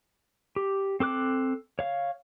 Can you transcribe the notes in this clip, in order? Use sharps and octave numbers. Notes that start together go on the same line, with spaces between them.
G4
C4 A4 D6 F#6
C#5 F5